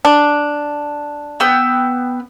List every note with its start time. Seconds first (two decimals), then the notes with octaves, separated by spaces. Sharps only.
0.05 D4
1.40 B3 G5 E6